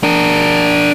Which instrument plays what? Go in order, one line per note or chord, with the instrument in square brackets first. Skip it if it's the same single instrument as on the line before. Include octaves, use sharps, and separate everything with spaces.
[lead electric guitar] D4 A#4